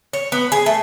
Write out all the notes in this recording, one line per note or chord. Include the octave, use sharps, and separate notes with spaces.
C#5
B3
G#4
A3